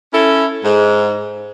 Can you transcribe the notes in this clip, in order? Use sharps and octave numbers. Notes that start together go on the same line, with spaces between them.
C#4 E4 A4
G#2